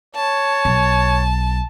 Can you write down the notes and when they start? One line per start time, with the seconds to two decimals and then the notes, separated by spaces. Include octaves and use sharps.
0.15 C#5 A5
0.65 B1